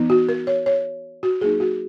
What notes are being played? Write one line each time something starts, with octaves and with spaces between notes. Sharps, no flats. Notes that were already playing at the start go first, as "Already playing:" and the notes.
Already playing: E3 B3 D#4
F#4
A#4
C#5
C#5
F#4
F#3 A#3 D#4 G#4
F#4